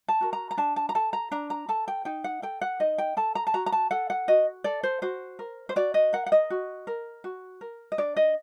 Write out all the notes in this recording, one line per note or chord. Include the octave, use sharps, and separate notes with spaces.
A5
F#4 A#4
A#5
A#5
D4 A5
A5
A#5
A4 A5
A#5
D4 A#5
A#5
A4 A5
G5
D#4 G5
F#5
A4 G5
F#5
D#4 D#5
G5
A4 A5
A#5
A5
F#4 A#5
A#5
A5
A4 F#5
F#5
F#4 D#5
A4 D5
C5
F#4 C5
A#4
C5
F#4 D5
D#5
A#4 F#5
F#5
D#5
F#4
A#4
F#4
A#4
D#5
D4 D5
D#5